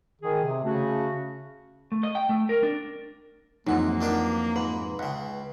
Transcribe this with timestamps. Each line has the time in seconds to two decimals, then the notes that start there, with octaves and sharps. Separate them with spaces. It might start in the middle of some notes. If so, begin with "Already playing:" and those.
0.22 D#3 G#4
0.44 C3
0.64 C#3 A3 C#4 F#4
1.92 A3
2.03 D#5
2.15 G5
2.29 A3
2.49 A#4
2.63 D4
3.67 F2 G#2 E3 F#3 A#3 D#4 F#5
4.01 D#3 D4 G4
4.56 G#2 B4
4.99 C#2 C#3 F#5